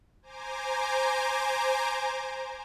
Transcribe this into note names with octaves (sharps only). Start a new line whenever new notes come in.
C5 G#5 A#5 D6